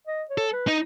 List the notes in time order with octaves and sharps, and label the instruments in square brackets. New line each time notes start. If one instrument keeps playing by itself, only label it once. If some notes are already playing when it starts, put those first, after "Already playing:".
[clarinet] D#5
C#5
[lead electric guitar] A4
[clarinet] B4
[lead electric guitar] D#4